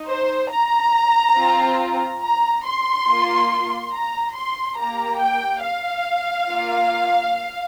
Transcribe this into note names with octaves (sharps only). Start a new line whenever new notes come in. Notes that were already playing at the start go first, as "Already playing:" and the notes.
Already playing: D#4
C5
A#5
C4 F4
A#5
C6
A#3 F4
A#5
C6
A#3 G4 A#5
G5
F5
A#3 F4